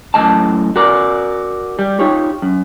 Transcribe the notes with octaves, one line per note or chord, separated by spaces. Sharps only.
F#2 A2 E3 D#5 A5
F#4 A#4 D5
G3
D#4 F4 G4 C#5
F#2